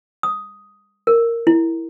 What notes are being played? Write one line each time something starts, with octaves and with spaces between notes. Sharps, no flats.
D#6
A#4
E4